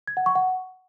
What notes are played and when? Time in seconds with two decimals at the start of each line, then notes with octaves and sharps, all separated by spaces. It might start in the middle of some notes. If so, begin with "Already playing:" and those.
0.08 G#6
0.17 F#5
0.26 C#6
0.35 F#5